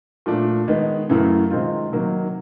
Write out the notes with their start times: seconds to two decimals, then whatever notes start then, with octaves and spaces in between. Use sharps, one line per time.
0.26 A#2 F3 A3 D4
0.68 D#3 G#3 B3
1.09 F#2 C#3 E3 A3
1.50 C3 D#3 G#3 C4 F4
1.92 C3 D#3 F#3 A#3